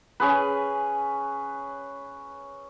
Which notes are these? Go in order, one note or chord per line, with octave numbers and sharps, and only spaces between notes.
C#4 G#4 B4